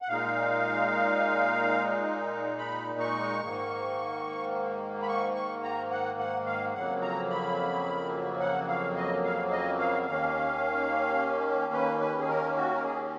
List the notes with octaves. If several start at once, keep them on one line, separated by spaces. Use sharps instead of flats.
F#5
A#2 G#3 D#4 F5
B5
C#6
G#2 D#3 A#3
B5
C#6
C#6
A#5
F#5
F#5
F5
F2 C#3 F#3 A#3 F#5
A#5
B5
F#5
F5
D#5
F5
D#5
F5
D#2 D#3 A#3 C#4 F5
B4
B4
G#4
A#4
F#4
A#4
G#4